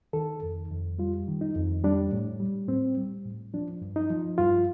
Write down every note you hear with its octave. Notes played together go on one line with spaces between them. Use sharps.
D#3 A4
F2
F2
G3 F4
D#3
D#4
F2
G3 D4
A2
G3
A2 C4
G3
A2
F3 D4
G2
D#4
F3
G2 F4